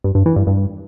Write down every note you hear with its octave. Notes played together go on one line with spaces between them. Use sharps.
G2
G2
E3
G2
G2